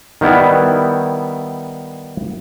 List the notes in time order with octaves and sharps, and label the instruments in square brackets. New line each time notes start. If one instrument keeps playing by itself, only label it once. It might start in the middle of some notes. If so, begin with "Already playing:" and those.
[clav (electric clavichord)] D#3 G3 B3 E4